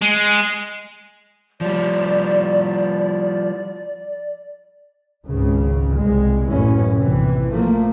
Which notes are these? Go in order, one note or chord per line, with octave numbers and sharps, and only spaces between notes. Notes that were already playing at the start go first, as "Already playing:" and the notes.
G#3
F3 G3 D5
G#1 C#2 G#2 C#3
C2 G#3
A1 F#2 A2 E3 C#4
A#1 C3 E3
A#2 F3 A3 A#3